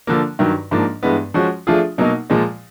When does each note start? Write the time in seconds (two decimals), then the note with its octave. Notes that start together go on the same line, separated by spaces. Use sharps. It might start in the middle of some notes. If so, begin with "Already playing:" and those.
0.07 D3 F3 A#3
0.39 G2 D#3 F#3
0.71 G#2 F3 A#3 D4
1.03 G2 E3 G#3 B3
1.34 F3 G#3 C#4 F#4
1.67 F3 A3 D4 F4 G#4
1.98 B2 F#3 A#3 D#4
2.30 A#2 F3 G#3